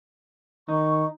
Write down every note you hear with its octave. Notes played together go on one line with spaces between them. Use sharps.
D#3 D#4 C#6